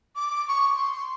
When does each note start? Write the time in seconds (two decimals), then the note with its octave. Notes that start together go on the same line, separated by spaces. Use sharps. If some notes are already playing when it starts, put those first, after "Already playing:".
0.15 D6
0.48 C#6
0.74 C6